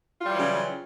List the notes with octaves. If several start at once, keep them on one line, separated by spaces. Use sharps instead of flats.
C#3 E3 F#3 G3 F4